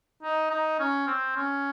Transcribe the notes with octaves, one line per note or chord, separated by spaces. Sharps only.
D#4
D#4
C#4
C4
C#4